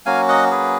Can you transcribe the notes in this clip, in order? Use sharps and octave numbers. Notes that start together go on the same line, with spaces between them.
F#3 A#3 C#4 F#4 F5 G#5
D#5 F#5
G#4 B4